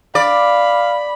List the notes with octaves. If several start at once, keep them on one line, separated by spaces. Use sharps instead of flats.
D5 F5 B5